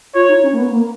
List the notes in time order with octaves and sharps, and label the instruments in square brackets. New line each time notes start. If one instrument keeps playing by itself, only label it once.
[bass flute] F4 [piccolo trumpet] C#5
[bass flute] D#4
C#4
A#3
B3
A#3